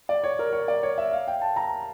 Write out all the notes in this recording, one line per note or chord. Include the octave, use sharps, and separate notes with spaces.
D5
C#5
A#4
C#5
D5
C#5
E5
F5
G5
A5
A#5